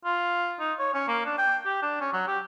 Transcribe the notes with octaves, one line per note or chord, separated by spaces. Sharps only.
F4
D#4
C#5
C#4
A#3
D4
G5
G4
D4
C#4
F#3
G4